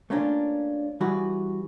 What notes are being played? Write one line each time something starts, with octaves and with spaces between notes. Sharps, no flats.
A3 A#3 C#4 D4 F4
E3 G3 E4 F#4 G#4 B4